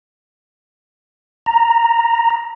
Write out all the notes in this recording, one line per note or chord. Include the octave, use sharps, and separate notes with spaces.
A#5